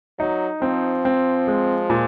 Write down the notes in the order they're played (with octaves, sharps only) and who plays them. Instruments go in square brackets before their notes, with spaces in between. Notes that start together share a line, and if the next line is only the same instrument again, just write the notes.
[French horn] F#3 [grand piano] D#4
[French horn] F3 [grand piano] C4
[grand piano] C4
G#3
A#2